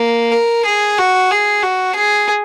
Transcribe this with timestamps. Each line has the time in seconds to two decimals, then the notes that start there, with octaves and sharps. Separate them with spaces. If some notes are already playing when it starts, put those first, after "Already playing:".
Already playing: A#3
0.32 A#4
0.66 G#4
0.98 F#4
1.31 G#4
1.63 F#4
1.96 G#4